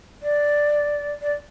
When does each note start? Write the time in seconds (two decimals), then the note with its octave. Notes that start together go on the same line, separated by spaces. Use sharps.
0.23 D5
1.22 D5